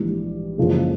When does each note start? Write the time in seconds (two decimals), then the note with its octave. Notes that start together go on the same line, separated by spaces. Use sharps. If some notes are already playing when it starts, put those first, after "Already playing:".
Already playing: A#1 G#2 E3 G3
0.58 F#1 E2 C#3 F3 G#3